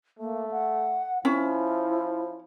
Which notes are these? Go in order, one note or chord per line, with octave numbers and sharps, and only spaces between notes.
A3 A#3
F#5
F3 C#4 E4